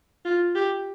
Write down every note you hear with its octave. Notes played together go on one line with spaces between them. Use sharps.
F4
G4